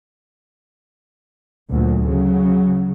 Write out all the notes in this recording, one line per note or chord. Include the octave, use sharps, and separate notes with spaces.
D2 A#2 F#3
C#3 F#3